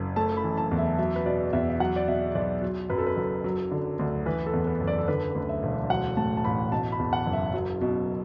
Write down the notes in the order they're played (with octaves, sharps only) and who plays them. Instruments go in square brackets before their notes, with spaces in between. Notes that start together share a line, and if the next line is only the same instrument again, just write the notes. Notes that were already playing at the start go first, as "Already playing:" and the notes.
Already playing: [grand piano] F#1
A3 A5
B5
E3
A5
E2
E5
F#3 E5
B4
B2 D5
E2 E5
E5
F#3 F#5
D5
B2 E5
B1 D5
F#3
F#2 B4
A4
B4
F#1 A4
F#3
D3
D2
E3 B4
A4
E2
B4
F#1
D5
A4
D3 B4
D2
E5
E1
F#3 F#5
A2 A5
A5
A1 B5
B2 A5
B5
E2
F#5
F#1
E5
F#3
B2